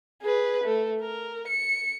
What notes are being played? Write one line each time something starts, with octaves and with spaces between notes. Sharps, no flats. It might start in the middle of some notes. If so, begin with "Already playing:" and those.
G#4 B4
A3
A#4
C#7